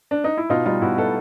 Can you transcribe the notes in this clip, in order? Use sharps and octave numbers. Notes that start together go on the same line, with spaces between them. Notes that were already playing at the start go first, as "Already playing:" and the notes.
D4
D#4
E4
B2 D#4 F4
G3 D#4 F4
B2 E4 F#4
B2 A4 B4